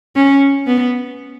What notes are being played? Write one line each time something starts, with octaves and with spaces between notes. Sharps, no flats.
C#4
B3